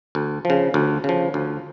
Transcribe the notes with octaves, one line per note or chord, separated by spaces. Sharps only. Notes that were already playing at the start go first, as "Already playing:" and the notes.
D2
C#3 F3
D2
C#3 F3
D2